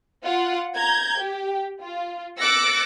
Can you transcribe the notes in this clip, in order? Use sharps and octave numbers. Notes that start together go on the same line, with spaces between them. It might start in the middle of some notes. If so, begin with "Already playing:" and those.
F4 F#5
A#5 G6 G#6
G4
F4
D6 E6 F#6 A6 A#6 C#7